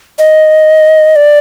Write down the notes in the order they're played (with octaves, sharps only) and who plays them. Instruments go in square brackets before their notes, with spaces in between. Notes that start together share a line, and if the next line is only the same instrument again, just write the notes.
[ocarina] D#5
D5